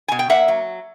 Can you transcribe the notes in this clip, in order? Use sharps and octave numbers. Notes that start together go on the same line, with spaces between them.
B2 G#5
G5
A#3 E5 F#5
F#3